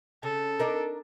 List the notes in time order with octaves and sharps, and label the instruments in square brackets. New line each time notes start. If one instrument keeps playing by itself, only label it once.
[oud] C#3 [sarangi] A4
[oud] D4 D#4 A#4